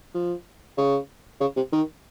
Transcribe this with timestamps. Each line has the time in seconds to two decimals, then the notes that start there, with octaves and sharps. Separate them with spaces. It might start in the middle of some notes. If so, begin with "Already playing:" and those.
0.14 F3
0.78 C#3
1.41 C#3
1.56 C3
1.72 D#3